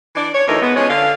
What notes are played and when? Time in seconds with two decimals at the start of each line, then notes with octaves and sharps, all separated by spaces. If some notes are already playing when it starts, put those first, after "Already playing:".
0.16 E3 D4 D5
0.34 C#5
0.47 D2 E3 D#4 A4 A#4
0.62 G#2 G#3 B3
0.75 F3 G#3 C#4 G#4 C#5
0.89 D3 F5